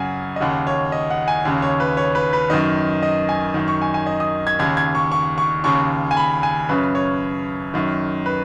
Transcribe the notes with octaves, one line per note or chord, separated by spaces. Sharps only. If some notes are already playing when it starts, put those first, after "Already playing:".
Already playing: F#2 C#3 F#5 G#5
D#5
D#2 C#3 F#5
C#5
D#5
F#5
G#5
D#2 C#3
C#5
B4
C#5
B4
B4
F#2 D#3 D#5
D#5
G#5
F#2 D#3
C#6
G#5
G#5
D#5
D#6
G#6
D#2 C#3 G#6
G#6
C#6
C#6
C#6
D#2 C#3 C#6
G#5
B5
G#5
F#2 C#3 B4
C#5
F#2 D#3
B4